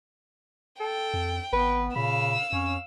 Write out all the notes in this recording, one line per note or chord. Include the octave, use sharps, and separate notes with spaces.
A4 G5
F2
G#1 B3 B4
A#2 C#3 F5 B5 E6
F2 C#4 C#5